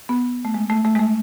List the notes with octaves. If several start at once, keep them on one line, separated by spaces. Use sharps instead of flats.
B3
A3
G#3
A3
A3
G#3
A3